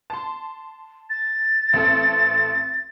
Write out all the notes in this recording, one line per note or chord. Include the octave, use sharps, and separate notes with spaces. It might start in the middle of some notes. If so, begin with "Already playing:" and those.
A5 C6
A6
A1 C4 A4